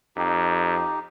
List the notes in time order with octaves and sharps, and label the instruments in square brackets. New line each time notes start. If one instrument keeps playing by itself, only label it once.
[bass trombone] F2 [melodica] D#4 G4